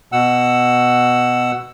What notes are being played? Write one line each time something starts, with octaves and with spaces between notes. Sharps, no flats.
B2 F#5 E6